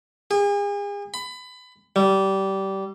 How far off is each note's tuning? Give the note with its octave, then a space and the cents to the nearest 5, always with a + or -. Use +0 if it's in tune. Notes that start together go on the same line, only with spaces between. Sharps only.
G#4 -40
B5 +25
G3 -20